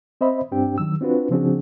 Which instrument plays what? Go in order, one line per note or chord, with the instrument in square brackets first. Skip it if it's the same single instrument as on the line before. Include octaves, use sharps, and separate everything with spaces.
[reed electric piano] C4 C5 D#5 E5 B5
G2 C4 D4 G4 G5
D#3 F#3 E6
C4 D4 F4 F#4 B4
C#3 F3 C4 D4 F#4 G#4